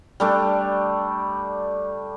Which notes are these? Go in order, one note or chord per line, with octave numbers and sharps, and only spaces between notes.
G3 A3 D4